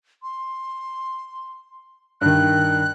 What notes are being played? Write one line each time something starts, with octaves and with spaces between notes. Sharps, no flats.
C6
G2 D#3 F#6